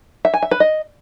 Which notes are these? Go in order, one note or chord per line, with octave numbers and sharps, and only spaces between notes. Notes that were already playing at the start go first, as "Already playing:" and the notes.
E5
G#5
E5
B4
D#5